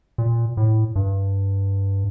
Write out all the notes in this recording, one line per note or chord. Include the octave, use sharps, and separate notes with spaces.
A#2
A2
G2